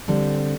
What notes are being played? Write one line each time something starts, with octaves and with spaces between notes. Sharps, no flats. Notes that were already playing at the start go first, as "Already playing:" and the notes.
D3 G3 C4